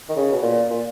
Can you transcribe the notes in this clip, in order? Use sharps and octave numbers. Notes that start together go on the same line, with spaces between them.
D#3
C#3
B2
A#2
A#2